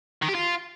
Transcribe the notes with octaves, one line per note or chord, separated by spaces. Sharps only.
D#3
G4
F4